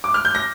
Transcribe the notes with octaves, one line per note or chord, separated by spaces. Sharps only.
D6
F6
G6
A#6